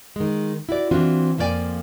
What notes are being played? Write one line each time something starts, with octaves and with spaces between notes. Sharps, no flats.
D#3 G#3
E4 F#4 D5
E3 C4 D4 F4 F#4
F2 F3 A#3 C4 D5 G#5